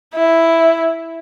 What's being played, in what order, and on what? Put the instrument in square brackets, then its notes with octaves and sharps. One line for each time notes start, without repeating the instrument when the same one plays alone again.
[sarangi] E4